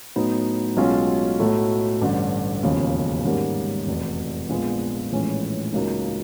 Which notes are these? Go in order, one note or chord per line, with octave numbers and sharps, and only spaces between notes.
A2 F#3 B3 D#4
B1 B2 G#3 C#4 F4
B1 A2 F#3 A3
A1 G2 D3
E1 D#2 C#3 F3
G#2 D#3 G3 A#3 C#4
F1 E2 B2
A#1 A#2 F3 G#3 B3
A#1 A2 E3 G#3 C#4
C#2 C#3 F#3 A#3 D#4